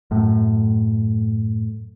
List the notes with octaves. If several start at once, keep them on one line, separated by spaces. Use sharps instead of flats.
F#2 A2